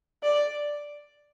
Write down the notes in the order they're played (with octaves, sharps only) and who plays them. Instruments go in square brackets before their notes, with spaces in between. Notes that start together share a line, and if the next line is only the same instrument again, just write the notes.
[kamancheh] D5